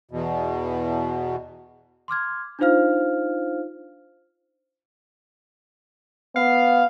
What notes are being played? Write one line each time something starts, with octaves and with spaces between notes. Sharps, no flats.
E2 B2
C6 D6 F6 G#6
D4 D#4 F4 C5 F5 F6
B3 F5